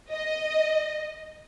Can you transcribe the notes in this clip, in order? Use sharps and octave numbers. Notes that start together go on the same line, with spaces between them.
D#5